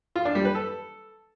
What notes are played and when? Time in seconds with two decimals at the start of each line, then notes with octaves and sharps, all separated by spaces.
0.16 F4
0.25 D4
0.35 G3
0.45 B4
0.55 A4